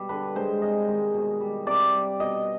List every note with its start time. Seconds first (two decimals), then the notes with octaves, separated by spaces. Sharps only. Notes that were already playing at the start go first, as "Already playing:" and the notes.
Already playing: B2 G3
0.09 D3 B4
0.35 G#3 C5
0.62 C3 D#5
0.88 D#3 G#3
1.14 B2
1.40 G3
1.67 C3 D5
1.94 G3
2.20 B2 D#5